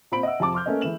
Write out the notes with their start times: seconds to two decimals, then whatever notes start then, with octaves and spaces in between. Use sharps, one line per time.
0.12 A#2 C4 C5 B5 D7 F#7
0.23 D#5 E5 F#5 E6
0.40 F2 C3 A5 D6
0.54 C6 D6 F6 G6
0.66 A3 A#3 C#4 B4 D#5
0.81 E3 G#3 A3 E7 F#7